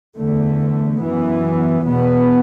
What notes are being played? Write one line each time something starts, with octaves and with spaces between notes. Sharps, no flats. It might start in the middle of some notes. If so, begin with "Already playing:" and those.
E2 D3 A3
F#2 E3 B3
E2 B2 B3